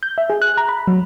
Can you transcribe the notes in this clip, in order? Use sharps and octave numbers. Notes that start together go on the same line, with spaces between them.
G6
E5
G#4
F#6
A#5
B5
F#3